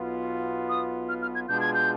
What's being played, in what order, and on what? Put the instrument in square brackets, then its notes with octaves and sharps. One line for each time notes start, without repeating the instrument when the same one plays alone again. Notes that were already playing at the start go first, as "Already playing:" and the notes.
Already playing: [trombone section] B1 B2 B3 F4
[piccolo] D#6
F6
F6
G#6
[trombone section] B2 G#3 D4 F4 G#4 [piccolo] G6
[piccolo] G#6
G6